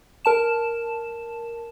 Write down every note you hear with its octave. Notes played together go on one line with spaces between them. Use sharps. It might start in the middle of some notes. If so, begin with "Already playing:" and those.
A#4 A5 E7